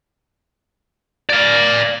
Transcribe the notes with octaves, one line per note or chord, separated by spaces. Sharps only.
D5 F5